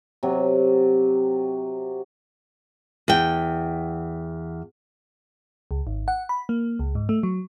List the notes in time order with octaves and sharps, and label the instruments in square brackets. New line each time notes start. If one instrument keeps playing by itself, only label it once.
[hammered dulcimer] C3 F#3
[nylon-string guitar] E2 G5
[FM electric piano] C#2
G#1
F#5
B5
A#3
C#2
G#2
A3
F#3